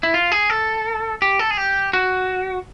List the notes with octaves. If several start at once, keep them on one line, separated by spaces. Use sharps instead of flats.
E4
F4
G#4
A4
G4
A4
G#4
G4
F#4